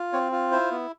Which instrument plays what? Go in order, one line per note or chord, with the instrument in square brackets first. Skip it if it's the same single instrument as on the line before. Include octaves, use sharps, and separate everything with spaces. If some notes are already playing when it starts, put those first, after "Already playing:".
Already playing: [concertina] F4
C4 C#5
F4
E4 C5
B3